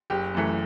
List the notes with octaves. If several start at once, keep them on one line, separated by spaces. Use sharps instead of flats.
F#1 G4
F#2 E3 A3